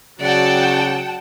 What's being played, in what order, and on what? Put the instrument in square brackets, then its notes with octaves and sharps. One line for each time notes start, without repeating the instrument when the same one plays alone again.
[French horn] C#3 [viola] F#3 [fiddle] D5 [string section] F#5 G5 A5